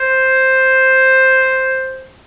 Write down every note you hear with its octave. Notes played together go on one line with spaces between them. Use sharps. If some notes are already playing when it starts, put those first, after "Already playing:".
Already playing: C5